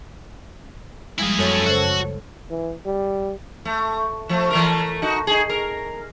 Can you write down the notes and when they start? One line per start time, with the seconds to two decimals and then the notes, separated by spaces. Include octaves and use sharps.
1.19 F3 G3 G#3 E4 G#4
1.38 F#2 A4 C#5
1.66 C#3 F#4 C5
2.50 E3
2.85 G3
3.65 A3
4.29 F3 A3
4.50 E3 A3 A#4
5.02 D#4 F#4
5.27 D#4 G#4
5.50 A#4